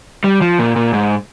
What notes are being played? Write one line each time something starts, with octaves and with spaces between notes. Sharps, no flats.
G3
F3
A#2
A#2
G#2